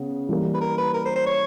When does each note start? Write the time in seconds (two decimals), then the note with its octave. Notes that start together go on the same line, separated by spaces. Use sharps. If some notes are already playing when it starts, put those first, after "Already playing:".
Already playing: C#3 B3
0.29 E3 G3 A#3
0.54 B4
0.61 A#4
0.78 B4
0.94 A#4
1.05 C5
1.15 C5
1.26 C#5